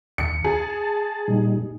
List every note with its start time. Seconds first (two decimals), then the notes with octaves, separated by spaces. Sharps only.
0.18 D#2 C#7
0.44 G#4 A5
1.28 A#2 G3 D#4